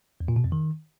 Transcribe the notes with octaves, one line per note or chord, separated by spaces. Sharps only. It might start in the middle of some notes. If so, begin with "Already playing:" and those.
E2
A#2
B2
F2
D#3